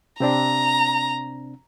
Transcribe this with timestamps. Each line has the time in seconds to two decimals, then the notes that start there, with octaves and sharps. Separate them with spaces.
0.20 C3 C4 D4 A#5